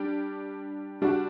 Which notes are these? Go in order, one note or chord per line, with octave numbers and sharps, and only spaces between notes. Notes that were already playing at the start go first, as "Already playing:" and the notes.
Already playing: G3 D4 G4
G3 D4 F#4